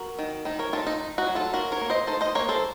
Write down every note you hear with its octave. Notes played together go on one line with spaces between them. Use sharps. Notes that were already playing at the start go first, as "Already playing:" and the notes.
Already playing: F#4 A#4
D#3
D#3 D#4
A#4 C#5
D#3 F4 A4
D#4
D#4
D#4 F#4
F#3
F4 A4
F#3 F#4 A#4
A#4 C#5
A#3
C5 D#5
D#4 A4 C5
C5 D#5
A#3 A#4 C#5
A4 C5